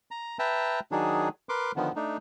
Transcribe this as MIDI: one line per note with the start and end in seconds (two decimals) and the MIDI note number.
0.11 0.38 82
0.39 0.80 71
0.39 0.80 76
0.39 0.80 79
0.39 0.80 81
0.39 0.80 82
0.92 1.29 51
0.92 1.29 54
0.92 1.29 62
0.92 1.29 63
0.92 1.29 68
1.49 1.72 70
1.49 1.72 71
1.49 1.72 84
1.49 1.72 86
1.76 1.92 50
1.76 1.92 51
1.76 1.92 53
1.76 1.92 59
1.96 2.17 57
1.96 2.17 62
1.96 2.17 63